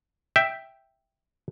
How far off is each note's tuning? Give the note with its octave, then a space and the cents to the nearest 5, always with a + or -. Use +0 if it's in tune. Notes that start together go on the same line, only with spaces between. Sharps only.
E5 +0 G5 +0